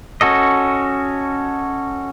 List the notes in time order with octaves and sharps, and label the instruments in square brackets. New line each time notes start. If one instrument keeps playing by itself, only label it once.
[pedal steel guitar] C#4 F#4 A4 D#5